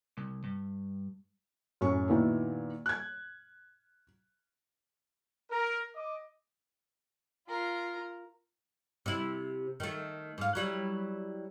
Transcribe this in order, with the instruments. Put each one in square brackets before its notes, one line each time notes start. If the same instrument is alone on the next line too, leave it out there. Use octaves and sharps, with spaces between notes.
[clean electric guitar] C2
G2
[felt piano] F#2 A2 C#4 C#6
A#2 D#3 B3 E4 F#4
F#6 G#6
[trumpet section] A#4
D#5 D6
[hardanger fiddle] F4 A#4
[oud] C3 E4
D#3 A3
G#2 F5
F#3 G3 E4